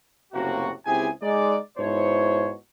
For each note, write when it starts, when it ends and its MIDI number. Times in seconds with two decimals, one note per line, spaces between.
0.33 0.69 30
0.33 0.69 45
0.33 0.69 48
0.33 0.69 58
0.33 0.69 66
0.86 1.07 37
0.86 1.07 60
0.86 1.07 64
0.86 1.07 67
0.86 1.07 68
0.86 1.07 80
1.22 1.56 56
1.22 1.56 63
1.22 1.56 74
1.78 2.52 44
1.78 2.52 47
1.78 2.52 64
1.78 2.52 72
1.78 2.52 73